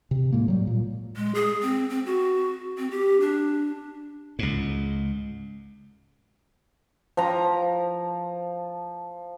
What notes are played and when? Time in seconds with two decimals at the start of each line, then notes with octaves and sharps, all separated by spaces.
0.11 C3
0.33 A2 G#3 A#3
0.48 F#3 G3
0.67 A#2
1.16 G#3
1.35 G#4
1.62 C4
1.90 C4
2.06 F#4
2.78 C4
2.91 G4
3.21 D4
4.39 C#2 G#2
7.17 F3 A#5